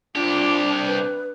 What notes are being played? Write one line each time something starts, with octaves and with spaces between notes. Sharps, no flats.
C2 D4 F4 G4
B4